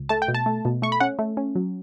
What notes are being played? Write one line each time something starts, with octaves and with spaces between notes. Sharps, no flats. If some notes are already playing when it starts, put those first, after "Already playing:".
Already playing: C#2
A3 A5
G5
B2
A5
A3
B2
A3 C#6
B5
C#4 F#5
A3
C#4
F#3